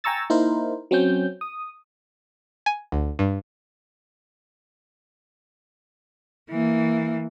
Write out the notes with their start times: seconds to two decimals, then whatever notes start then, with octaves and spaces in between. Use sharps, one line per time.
0.04 G5 G#5 A#5 C#6 E6 A6
0.30 A#3 D#4 E4 A#4 C5
0.91 F#3 C4 C#4 G6
1.41 D#6
2.66 G#5
2.92 D2
3.19 G2
6.50 E3 A#3